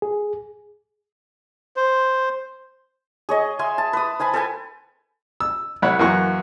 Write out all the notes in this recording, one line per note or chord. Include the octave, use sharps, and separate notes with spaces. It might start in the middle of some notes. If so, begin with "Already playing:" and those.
G#4
C5
G#4 C#5 D#5
E5 G#5 C6
A5
B4 D#6
C5 G#5 A5 B5
A4 B4 G5 G#5
E6
C2 C#5 F#5 B5
F#2 E3 A#3 F#5 C6 C#6